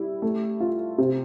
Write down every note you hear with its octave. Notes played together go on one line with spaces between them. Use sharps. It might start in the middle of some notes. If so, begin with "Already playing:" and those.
Already playing: G3 E4
A3
F4
C3